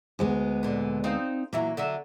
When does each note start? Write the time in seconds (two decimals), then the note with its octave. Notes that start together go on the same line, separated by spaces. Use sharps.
0.19 D2 G#3 B3
0.63 A#2 D3
1.04 C4 D#4 F5
1.53 A#2 E3 F#3 A#3
1.77 D3 F#3 E5